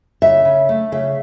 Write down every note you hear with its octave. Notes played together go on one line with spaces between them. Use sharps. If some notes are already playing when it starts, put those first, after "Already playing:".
C#3 E5
C#3
A3
C#3 E5